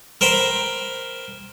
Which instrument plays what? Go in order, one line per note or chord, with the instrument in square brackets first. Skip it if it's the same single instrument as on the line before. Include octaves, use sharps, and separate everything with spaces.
[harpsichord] A#4 C5 G5 B5